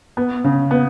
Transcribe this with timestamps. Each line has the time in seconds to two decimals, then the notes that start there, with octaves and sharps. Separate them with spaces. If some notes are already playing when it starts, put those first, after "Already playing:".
0.17 B3
0.44 C#3
0.71 B3